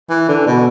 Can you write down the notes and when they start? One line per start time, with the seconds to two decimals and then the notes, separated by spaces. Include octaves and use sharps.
0.10 E3
0.28 D3
0.46 B2